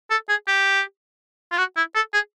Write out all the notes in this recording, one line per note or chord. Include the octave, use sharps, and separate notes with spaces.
A4
G#4
G4
F4
F#4
E4
A4
G#4